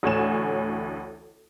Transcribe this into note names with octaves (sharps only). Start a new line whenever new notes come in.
A1 D2 A2 C#5 G#5 E7